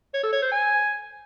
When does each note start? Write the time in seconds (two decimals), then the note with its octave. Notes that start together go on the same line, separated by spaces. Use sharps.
0.14 C#5
0.23 A4
0.33 C#5
0.42 C5
0.52 G#5